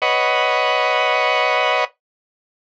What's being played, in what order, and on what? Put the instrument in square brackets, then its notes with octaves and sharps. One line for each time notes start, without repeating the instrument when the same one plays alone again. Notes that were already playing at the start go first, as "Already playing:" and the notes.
[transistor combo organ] B4 C#5 D#5 F#5